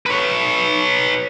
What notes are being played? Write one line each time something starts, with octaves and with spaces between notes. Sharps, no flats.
B4 C#5